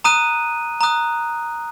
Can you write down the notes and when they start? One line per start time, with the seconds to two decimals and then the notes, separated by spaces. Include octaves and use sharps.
0.04 A#5 D#6 F#6 D#7
0.81 A#5 D#6 F#6